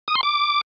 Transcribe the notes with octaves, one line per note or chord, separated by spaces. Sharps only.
D#6
C6
D6